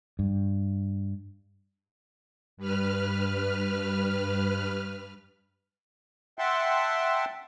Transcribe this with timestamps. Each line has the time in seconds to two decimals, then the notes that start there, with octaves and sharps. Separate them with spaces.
0.19 G2
2.57 G2 B4 F6
6.39 E5 F#5 G5 A5 C6